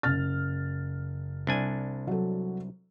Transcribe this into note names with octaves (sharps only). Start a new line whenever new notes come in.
F#1 F6 A6
C2 D4 G#5
F#3 A4